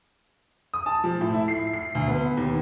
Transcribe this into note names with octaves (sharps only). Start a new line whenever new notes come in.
D#6
A5
F3
A2
E4
C7
C7
D2
B3
D#2